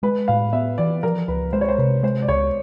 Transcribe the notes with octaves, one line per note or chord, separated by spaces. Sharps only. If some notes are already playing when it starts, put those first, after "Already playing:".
G#3 B4
A2 F5
B3 E5
E3 D5
F3 A#4
C#2 B4
G#3 C5
C#5
C5
C3 B4
G#3 C5
D5
C#2 C#5